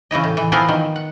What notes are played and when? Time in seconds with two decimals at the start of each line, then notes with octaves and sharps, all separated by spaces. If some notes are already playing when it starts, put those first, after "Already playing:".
0.11 C#3 E3 E4 D#5
0.24 A2
0.37 E3
0.52 E3 F3 B3 E4 A#4 F5
0.69 D#3
0.96 F#5